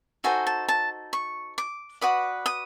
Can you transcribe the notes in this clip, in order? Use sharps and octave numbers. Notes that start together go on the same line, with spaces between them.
D#4 F#4 A4 C5 G#5
A5
A5
C#6
D6
F#4 B4 D5 D#6
D#6